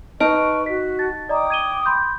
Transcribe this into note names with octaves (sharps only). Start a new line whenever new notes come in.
D#4 B4 D#5 A5 C#6 F6 D7
F#4 B6
A5 A6
D5 D#5 G5 A#5 D6 D#6
G#6 D#7 G7
B5 C6 G6